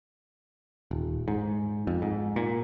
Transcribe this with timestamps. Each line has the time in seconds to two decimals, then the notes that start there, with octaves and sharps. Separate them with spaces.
0.91 D#1
1.28 G#2
1.87 F2
2.02 G#2
2.36 A#2